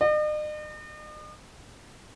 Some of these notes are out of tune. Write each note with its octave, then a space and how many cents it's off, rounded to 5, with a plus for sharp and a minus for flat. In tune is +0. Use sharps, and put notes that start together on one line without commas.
D#5 -45